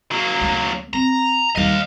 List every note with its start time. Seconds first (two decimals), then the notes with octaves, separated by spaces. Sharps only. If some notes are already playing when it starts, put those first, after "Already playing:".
0.11 F#3 A#3
0.41 D2 A3
0.93 C4 A#5
1.56 D#2 G3 D#5 F5